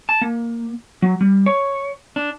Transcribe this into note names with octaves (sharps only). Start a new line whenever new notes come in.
A5
A#3
F#3
G3
C#5
D4